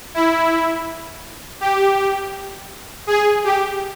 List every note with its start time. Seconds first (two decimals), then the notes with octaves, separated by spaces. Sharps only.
0.14 E4
1.61 G4
3.07 G#4
3.44 G4